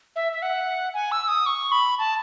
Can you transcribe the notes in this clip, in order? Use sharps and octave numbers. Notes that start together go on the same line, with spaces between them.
E5
E5
F#5
G#5
E6
D#6
C#6
B5
A5